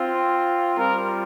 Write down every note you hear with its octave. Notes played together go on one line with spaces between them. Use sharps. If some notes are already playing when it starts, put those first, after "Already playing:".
Already playing: C4 F4
G3 C4 F4 A#4